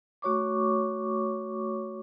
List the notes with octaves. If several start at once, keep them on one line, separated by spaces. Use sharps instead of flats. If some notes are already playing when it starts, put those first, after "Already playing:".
A3 F#4 C#5 C#6 D6